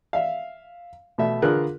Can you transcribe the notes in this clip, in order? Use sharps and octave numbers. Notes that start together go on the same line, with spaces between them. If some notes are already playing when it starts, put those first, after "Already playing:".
E5 F5
B2 A3 E5
D3 F4 G#4 A#4 B4 F#6